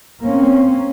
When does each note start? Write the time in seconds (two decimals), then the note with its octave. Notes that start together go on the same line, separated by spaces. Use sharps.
0.23 A#3 C4 C#4